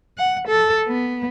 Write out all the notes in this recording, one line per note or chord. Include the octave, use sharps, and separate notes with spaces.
F#5
A4
B3